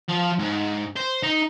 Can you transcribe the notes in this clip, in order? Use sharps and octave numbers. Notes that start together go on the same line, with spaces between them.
F3
G#2
C5
D#4